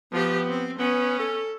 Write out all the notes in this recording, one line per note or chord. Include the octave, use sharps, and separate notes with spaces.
F3 B3 G4
C4
B3 C#4
A4